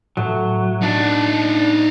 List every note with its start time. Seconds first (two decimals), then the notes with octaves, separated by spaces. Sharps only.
0.17 A2 F#3
0.83 D4 D#4 D5